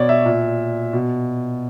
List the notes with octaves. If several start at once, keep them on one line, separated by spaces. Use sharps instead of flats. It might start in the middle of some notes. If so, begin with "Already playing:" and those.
Already playing: B2 C#5 D5
E5
A#2
B2